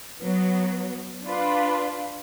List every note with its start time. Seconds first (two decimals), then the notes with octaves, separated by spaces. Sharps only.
0.22 F#3 B3
1.26 D4 F4 B4